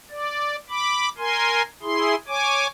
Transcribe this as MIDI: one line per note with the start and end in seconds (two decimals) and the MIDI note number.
0.11 0.56 74
0.70 1.09 83
0.70 1.09 86
1.18 1.62 70
1.18 1.62 80
1.18 1.62 84
1.83 2.15 64
1.83 2.15 68
1.83 2.15 84
2.28 2.67 73
2.28 2.67 80
2.28 2.67 86